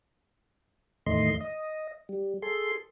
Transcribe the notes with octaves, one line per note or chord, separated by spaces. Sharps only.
E2 A2 D#3 A3 D#5 C6
D#5
G3
G#4 A4 C6